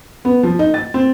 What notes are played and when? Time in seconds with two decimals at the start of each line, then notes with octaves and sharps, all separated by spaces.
0.25 B3
0.43 F3
0.59 D#4
0.74 A6
0.94 C4